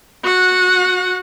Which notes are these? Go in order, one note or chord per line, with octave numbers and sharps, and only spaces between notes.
F#4 F#5